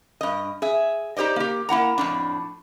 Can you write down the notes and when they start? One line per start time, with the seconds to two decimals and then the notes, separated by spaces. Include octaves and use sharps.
0.21 G2 D#5
0.62 G#4 E5
1.17 D#4 G4 C5 D5 D#5
1.36 A#3 G4
1.69 A#3 E4 F#5 A#5
1.98 F2 A2 D4